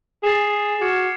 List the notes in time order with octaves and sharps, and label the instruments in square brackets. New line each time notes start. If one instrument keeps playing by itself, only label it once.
[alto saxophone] G#4 [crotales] A6 C7 E7
[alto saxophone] F#4 [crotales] D6 F6 G#6 C#7 E7